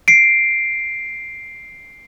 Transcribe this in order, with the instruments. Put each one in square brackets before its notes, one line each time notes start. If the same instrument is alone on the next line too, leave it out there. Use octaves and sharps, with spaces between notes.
[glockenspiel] C7 D7